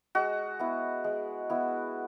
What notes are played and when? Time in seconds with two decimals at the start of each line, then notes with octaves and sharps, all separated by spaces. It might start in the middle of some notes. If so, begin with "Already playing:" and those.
0.15 G#3 F#4
0.59 B3 E4
1.04 G#3
1.50 B3 E4